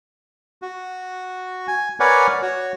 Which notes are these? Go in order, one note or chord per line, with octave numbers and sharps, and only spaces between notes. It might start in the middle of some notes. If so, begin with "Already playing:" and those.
F#4
G#5
A#4 B4 C#5 D5 F#5 G#5
F#4 C#5